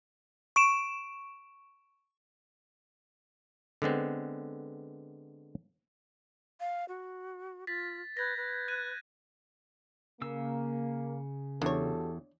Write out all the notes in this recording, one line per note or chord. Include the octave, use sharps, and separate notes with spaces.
C#6 D7 E7
D3 G#3 B3 C4
F5
F#4
F4 A6 B6
B4 G6 G#6 A#6
B4
F#6 G#6 D#7
C#3 A#3 E6
E2 D4 F#4 G4 A4 C#5